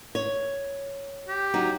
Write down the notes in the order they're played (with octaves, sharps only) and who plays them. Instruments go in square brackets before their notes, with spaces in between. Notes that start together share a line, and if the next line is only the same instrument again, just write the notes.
[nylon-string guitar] C#5
[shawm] G4
[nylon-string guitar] F#3 D#4